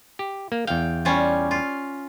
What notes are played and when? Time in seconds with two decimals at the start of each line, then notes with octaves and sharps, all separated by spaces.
0.19 G4
0.52 A#3
0.67 E2 F5 G5
1.05 G3 C#4 F4
1.51 F4